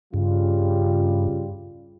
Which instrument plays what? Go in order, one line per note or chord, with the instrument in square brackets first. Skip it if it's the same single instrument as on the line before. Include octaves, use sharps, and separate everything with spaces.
[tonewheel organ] G2 [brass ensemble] C#3 G3 F4